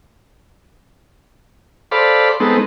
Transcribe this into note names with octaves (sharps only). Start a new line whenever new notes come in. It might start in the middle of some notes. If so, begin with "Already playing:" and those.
A4 C5 D5 F5 B5
G#3 B3 C4 D#4 A4